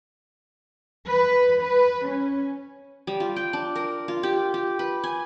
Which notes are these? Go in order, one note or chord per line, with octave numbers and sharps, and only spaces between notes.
B4
B4
C#4
G3
F4
G5
D4
A#4
F4
G4
G4
B4
G#5